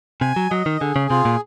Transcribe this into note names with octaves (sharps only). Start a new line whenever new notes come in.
C3 G#5
F#3
F#3 D#5
D#3
D3 G#4
C#3
C3 F4
A#2